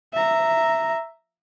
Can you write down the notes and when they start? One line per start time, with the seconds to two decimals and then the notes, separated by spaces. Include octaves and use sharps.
0.13 E5 A#5